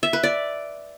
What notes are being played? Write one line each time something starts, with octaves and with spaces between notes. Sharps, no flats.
E5
B4
D5